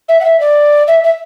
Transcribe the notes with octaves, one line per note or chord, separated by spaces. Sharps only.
E5
F#5
E5
D5
E5
E5